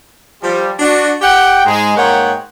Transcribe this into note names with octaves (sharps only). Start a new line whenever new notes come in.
F3 G3
D4 F#4
G4 F#5 G5
G#2 G#3
G#2 A#3 C#5 F#5 G5